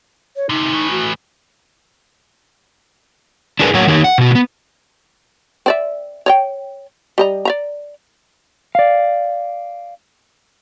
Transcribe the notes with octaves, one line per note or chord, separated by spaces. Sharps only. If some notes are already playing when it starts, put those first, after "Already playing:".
C#5
D2 C3 D#4
A2 E3
F#4
D4 E4 G#4 A#4 B4
A2 F#3 A#3 C#5 F#5
D#3 A#3 D#4 G4 C#5
F#5
B2 F#4
A#3 B3
C4 D5 E5
C#5 D#5 G5
G3 D#5 A#5
D5 E5 A#5
D5 F5